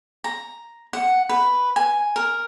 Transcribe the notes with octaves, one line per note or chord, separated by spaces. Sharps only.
A#5
F#5
B4
G#5
A#4